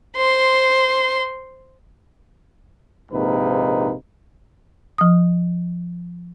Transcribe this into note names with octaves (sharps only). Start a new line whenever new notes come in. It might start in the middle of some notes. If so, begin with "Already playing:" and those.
C5 C6
A#1 G#2 C3 A#3 D#4 B4
F3 D#6